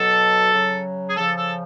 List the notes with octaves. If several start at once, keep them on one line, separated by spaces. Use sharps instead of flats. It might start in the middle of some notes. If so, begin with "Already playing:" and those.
Already playing: B2 F#3 A4
C#3 F#3
G#4
C#3 F3 A4
A4